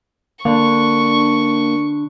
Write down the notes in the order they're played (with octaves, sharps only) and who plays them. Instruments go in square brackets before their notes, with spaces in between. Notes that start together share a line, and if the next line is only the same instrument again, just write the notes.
[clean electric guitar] D3 D4 [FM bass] A#3 [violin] C#6